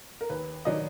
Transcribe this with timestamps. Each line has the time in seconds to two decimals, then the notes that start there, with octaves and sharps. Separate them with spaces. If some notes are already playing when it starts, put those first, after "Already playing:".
0.21 A#4
0.30 D#2 B4
0.65 D#3 F#3 D4 D#5